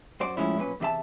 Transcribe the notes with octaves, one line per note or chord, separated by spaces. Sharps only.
F#2 F#4 C5 D5
A2 C#3 F3 G#3 C#4 E4
B1 A#2 C#4 G#4 B4
E2 C3 E4 E5 A5